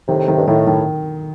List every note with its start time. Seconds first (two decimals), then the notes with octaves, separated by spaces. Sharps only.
0.08 A2 C3 D#3
0.28 D#3
0.37 G2
0.47 A2 D#3
0.67 D#3